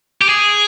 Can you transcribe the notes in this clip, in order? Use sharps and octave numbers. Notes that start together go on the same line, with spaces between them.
G4
G#4